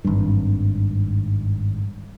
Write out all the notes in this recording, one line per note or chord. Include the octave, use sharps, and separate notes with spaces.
G#1 G2